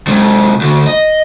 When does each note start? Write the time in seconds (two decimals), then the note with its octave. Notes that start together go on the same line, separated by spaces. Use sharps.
0.07 C3 G#3
0.61 D2
0.87 D#5